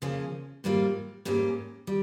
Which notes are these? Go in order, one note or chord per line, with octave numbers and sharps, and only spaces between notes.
C#3 F3 A#3 C#4
G#2 G3 A#3 F4
G#2 G3 A#3 C#4 G4
G3